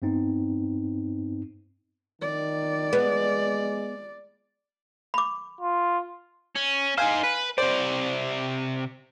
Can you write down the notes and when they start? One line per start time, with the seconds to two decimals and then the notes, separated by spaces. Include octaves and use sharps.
0.02 G2 B3 C4 D#4
2.21 D#3 D5
2.93 G#3 B3
5.14 B5 D6
5.61 F4
6.56 C#4
6.98 D#4 C5 F5 G#5
7.23 B4
7.58 C3 C5 D5